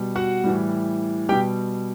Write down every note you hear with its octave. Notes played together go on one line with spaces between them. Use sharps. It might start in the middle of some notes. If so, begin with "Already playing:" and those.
Already playing: B2 G3
F#4 F#5
A2 E3 G3
B2 G3 G4 G5